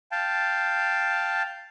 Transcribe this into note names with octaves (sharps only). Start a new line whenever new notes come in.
F5 G5 A5